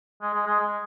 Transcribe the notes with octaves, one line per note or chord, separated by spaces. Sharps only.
G#3
G#3
G#3
G#3